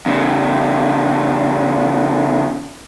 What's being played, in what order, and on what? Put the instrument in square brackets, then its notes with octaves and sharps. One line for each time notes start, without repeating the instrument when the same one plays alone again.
[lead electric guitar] E2 C#3